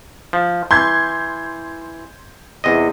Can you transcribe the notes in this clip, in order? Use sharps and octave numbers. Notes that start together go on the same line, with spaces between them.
F3
E3 C6 G6 G#6
E2 C3 D#5